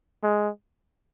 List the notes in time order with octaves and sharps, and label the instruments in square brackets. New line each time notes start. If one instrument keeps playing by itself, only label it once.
[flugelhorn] G#3